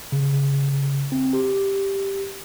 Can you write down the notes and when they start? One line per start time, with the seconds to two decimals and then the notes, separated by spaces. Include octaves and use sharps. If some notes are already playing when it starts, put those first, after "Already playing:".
0.12 C#3
1.12 C4
1.33 G4